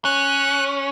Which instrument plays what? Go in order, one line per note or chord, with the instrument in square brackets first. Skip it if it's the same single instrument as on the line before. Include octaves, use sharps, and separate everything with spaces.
[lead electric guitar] C#4 [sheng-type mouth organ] F#6